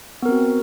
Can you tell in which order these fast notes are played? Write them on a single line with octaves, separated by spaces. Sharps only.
B3 A#4 C4 F#4